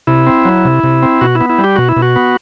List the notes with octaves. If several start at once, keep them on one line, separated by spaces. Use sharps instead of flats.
C3 E4
C4
F#3
C3
C3
C4
B2 F#4
E4
B3
E4
G3
G4
B2 F#4
E4
B2
F#4
B3